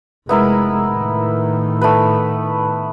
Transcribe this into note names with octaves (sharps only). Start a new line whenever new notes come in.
F1 G#3 B3 E4 A#4
A2 D#3
A3 B3 B4